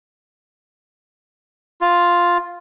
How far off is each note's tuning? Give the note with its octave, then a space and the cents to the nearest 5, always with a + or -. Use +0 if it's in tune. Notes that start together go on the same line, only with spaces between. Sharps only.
F4 +0